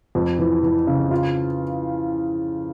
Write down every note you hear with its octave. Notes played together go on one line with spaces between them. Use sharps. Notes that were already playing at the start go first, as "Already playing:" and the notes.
F2
E3
E3
C#3
F4